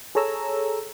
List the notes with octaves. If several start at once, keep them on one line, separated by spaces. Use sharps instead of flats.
G#4 A4 C#5 A#5 E6